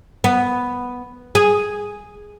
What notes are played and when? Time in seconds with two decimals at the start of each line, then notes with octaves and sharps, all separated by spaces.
0.24 B3
1.35 G#4